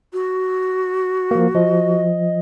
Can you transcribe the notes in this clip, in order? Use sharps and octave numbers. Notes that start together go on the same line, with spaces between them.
F#4
F3 A#3
F3 D#5